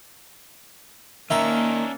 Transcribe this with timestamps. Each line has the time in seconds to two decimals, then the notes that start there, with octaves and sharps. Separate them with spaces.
1.30 D#3 A#3 C#4 D4 E5 A#5